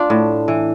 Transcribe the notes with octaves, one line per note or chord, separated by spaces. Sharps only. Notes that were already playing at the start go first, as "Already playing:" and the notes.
Already playing: D4 F4
A2
E3